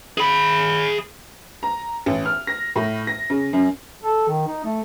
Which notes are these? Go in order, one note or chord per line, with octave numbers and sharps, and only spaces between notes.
G#4 B5
A#5
A1
F6
A#6
A2
A#6
C#3
F#2
A4
D#3
D#4
A3